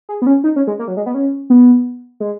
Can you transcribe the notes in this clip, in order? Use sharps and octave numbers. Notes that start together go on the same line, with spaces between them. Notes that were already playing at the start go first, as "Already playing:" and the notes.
G#4
B3
C#4
D#4
C#4
G#3
A#3
F#3
G#3
B3
C#4
B3
G#3